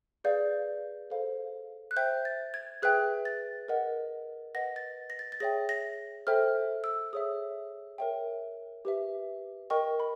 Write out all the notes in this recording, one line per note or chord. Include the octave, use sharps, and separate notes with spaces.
G#4 B4 D5 F5 G6
A4 C5 F5
F#6
C5 E5 G5 G6
A6
G#6
G#4 B4 E5 G5 F#6
A6
A#4 D#5 F#5
B4 D#5 F#5 A#6
A6
A#6
A6
A6
G#4 C#5 E5 G5 A#6
A#6
A4 C5 E5 G5 F6
E6
G#4 C#5 E5 D#6
A#4 C#5 E5 G5
G4 B4 E5
A#4 D#5 G5 C#6
B5